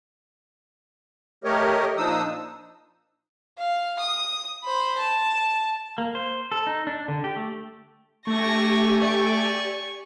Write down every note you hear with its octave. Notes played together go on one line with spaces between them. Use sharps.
A3 G4 A#4 C#5 D#5
A#2 F3 D4 D#4 D#6 E6
F5
D#6
C5 B5
A5
A#3
C5
A4
D#4
D4
D3
G4
A3
A3 D4 G4 G#5 C#6 A#6
D5 C#6